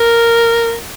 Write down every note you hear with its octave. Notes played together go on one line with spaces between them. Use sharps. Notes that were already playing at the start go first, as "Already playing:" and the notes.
Already playing: A#4